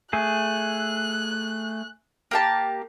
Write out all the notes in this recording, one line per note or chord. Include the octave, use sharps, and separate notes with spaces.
A3 G#4 F#6
A#3 G4 A5